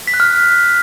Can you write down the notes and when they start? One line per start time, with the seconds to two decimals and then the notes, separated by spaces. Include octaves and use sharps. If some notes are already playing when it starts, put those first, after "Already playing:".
0.07 B6
0.14 F#6
0.20 F6